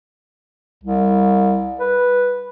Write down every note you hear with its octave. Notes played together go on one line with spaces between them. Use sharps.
C2
B4